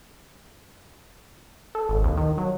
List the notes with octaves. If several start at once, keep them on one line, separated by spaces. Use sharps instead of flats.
A4
G#1
D#2
D#3
F#3